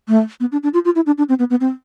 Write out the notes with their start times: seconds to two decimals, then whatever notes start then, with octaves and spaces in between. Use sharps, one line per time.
0.08 A3
0.40 B3
0.52 D4
0.63 D4
0.74 F4
0.85 F4
0.95 E4
1.06 D4
1.18 D4
1.29 C4
1.39 B3
1.50 B3
1.61 C4